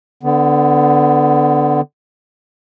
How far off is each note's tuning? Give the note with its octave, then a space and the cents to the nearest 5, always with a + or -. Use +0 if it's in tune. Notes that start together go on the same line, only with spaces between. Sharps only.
D3 +0 B3 +20